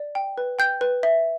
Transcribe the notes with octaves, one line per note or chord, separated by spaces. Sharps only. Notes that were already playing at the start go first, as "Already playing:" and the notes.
Already playing: D5
G5
B4
G5 G6
B4
E5